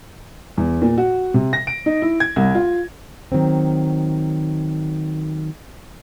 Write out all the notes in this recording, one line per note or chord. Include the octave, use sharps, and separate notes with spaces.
E2
A#2
F#4
C3
A#6
D7
D#4
E4
G#6
C2
F4
D#3 F#3 C4